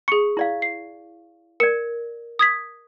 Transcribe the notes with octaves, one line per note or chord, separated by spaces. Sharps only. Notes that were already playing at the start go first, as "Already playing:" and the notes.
G#4 C#6 C#7
E4 D5 F5
C7
A#4 D5 C#7
D#6 G#6 B6